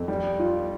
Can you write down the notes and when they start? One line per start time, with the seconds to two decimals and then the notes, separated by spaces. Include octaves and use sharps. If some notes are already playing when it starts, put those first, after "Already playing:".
Already playing: F2
0.08 G3
0.39 F4